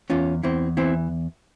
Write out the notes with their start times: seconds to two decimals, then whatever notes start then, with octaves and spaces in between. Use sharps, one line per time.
0.10 E2 C#4 F4
0.43 E2 C4 E4
0.77 E3 C4 E4